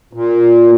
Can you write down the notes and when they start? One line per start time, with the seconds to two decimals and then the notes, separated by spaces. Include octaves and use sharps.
0.13 A#2